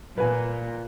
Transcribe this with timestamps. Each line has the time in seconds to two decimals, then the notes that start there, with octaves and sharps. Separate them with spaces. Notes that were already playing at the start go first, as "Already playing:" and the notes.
0.18 A#2 B4 G#5